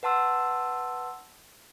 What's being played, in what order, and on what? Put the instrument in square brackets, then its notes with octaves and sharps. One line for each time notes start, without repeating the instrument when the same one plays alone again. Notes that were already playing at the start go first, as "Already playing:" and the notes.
[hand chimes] B4 F#5 A5 C6 E6